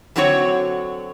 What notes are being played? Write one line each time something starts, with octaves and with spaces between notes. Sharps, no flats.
D3 F#3 C4 F#4 A4 C#5